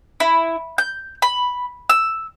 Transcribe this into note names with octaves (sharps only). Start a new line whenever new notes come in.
E4
G6
B5
E6